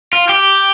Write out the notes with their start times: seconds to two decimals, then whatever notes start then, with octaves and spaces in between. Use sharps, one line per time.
0.13 F4
0.29 G4